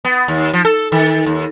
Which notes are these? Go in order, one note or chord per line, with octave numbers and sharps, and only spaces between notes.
B3
D#2
F3
A4
D#3
D#2